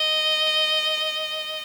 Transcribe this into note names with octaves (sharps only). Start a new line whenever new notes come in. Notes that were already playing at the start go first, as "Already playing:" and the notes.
Already playing: D#5